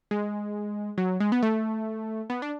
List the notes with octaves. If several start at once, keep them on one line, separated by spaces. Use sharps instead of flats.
G#3
F#3
G#3
B3
A3
B3
D4